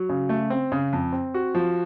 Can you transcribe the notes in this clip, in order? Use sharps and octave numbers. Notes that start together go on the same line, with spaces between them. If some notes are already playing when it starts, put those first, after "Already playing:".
Already playing: F#3
C#3
A3
C4
C#3
F2
C4
F#4
F3